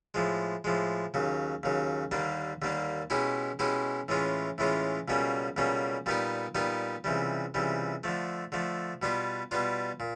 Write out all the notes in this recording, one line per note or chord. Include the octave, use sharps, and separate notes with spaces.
A2 F3 G#3
A2 F3 G#3
D#2 C#3 F#3
D#2 C#3 F#3
D#2 D3 G3 A#3 D4
D#2 D3 G3 A#3 D4
B2 G#3 C#4 E4 G4
B2 G#3 C#4 E4 G4
A2 E3 G#3 C#4 F4
A2 E3 G#3 C#4 F4
C#2 B2 G3 A#3 C#4
C#2 B2 G3 A#3 C#4
A#2 G3 B3 D#4 G4
A#2 G3 B3 D#4 G4
C#2 C3 E3 G3
C#2 C3 E3 G3
D3 F3 A3
D3 F3 A3
B2 G3 B3 D4 F4
B2 G3 B3 D4 F4
A#2